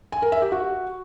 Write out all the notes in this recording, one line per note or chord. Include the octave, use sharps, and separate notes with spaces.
G#5
A#4
E5
G4
F#4